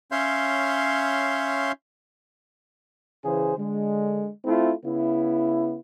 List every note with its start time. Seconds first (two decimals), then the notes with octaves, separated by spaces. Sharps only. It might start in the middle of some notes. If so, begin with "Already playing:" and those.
0.12 C#4 C#5 E5 F5 C6 G6
3.24 C#3 E3 G#4 C5
3.57 D3 G#3
4.45 A3 C4 E4 F4
4.85 C#3 B3 E4